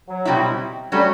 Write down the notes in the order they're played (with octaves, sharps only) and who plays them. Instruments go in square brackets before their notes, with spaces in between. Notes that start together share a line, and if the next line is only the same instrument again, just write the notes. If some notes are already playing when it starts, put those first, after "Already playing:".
[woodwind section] F#3
[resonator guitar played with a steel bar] B2 G3 C4 E4
[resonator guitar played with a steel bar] F#3 A3 C#4 F#4 [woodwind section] G3